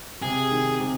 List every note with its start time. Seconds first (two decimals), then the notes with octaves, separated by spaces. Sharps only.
0.22 C3 G#4
0.51 D#3
0.80 C3